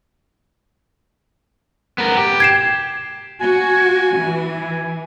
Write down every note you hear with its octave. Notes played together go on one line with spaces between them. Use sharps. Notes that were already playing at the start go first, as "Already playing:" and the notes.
B3 A#4
G4
G#6 C7 E7
F#4 G#5
E3